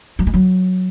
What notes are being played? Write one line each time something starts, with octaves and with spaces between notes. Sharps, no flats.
F#3
G#3
F#3